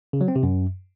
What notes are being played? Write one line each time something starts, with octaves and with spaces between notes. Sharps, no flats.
C#3
F#3
C4
C3
F#2